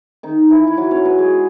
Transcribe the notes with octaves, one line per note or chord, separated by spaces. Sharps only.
D#3 D#4
E3 E4
E4
F#3 F#4
C#4 C#5
B3 B4
G#3 G#4